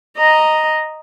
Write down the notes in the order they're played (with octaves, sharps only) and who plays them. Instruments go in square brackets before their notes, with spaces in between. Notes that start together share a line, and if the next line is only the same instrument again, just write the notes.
[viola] D#5 A#5